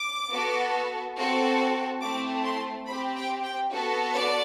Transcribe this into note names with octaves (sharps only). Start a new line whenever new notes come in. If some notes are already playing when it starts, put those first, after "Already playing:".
Already playing: D6
B3 F#4 A4
C4 F#4 A4
A3 C4 E4 D6
C6
C4 G4 B5
G5
G5
B3 F#4 A4
D5